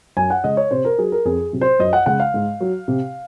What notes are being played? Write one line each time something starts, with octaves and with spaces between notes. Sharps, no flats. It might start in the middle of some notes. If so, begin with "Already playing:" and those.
F#2 G#5
F#5
C#3 G#3 D#5
C#5
C3 C5
A#4
F#3 G#4
A#4
F2 G#4
C3 F#3
C5
F#2 D#5
F#5
C#3 G#3 F#5
F5
G#2
F#3
C3